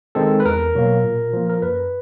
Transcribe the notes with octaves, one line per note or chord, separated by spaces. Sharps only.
D#3 G#3 C4 A4
B4
E2 A#4
B2 F#3 A#3
A#2
F3 A#3
A#4
F#2 B4